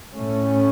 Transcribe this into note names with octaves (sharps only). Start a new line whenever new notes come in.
A2 A3 C#4